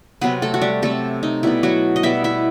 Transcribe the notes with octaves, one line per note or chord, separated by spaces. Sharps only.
C3 F#3 B3 C4 B4
A3 A4
F#4
G3 G4
C3 F#3 A3 C4 A4
D#4
B2 G3 B3 E4
F#3 F#4
D#5
B2 G3 B3 E4 E5
E4 E5